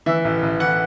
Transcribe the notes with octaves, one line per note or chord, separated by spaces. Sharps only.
E3 E5
A1
A1
E3 F#5